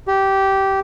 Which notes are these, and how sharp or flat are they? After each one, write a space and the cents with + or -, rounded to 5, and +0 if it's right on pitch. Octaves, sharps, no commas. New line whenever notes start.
G4 -15